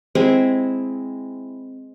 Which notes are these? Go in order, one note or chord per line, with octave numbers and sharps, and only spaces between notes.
G#3 C4 E4